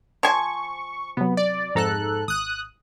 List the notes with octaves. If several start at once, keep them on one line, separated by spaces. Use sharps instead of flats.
F3 G#5 C#6
C3 F#3 B3
D5
F2 G#2 A4 A#5 F#6
G#1 D#6 F#6